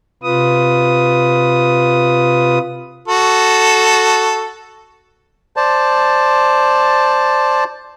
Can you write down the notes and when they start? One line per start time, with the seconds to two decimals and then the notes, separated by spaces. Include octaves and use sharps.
0.23 C3 F4 B4 D#6
3.08 F#4 A4
5.56 C5 D5 A5